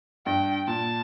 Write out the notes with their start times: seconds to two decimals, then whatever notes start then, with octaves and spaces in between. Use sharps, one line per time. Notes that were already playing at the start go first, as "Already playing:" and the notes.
0.26 G2 G5
0.67 A#2 A5